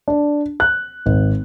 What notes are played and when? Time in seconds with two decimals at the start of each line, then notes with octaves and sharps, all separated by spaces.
0.08 D4
0.60 F#6
1.06 G#1